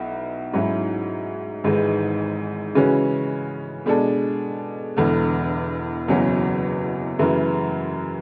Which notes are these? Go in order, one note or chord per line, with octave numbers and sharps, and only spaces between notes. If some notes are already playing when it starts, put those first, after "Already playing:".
Already playing: B1 B2 E4
G#2 F#3 C#4 E4
G#1 G#2 E3 G#3
C#3 E3 G#3 C#4 F#4
B2 G#3 D4 A4
E1 E2 D3
F#1 E2 B2 F#3 C#4
F#2 C#3 E3 A3